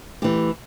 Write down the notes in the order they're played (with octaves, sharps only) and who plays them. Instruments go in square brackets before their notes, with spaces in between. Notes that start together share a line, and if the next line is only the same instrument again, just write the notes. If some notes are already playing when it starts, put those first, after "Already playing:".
[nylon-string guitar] E3 A3 G4